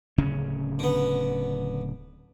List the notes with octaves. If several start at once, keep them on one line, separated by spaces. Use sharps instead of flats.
D1 C#3 C#4
D3 B3